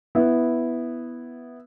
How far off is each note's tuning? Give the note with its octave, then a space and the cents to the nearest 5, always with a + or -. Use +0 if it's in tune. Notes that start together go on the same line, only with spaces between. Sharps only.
B3 +0 E4 +0